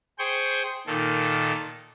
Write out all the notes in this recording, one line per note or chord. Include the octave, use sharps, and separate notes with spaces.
G#4 C5 G5 C#6
A#2 D#3 A4